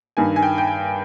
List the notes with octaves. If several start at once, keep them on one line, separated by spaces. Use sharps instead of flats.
G2 D#3 G#5
G#5
G5
G5
G#5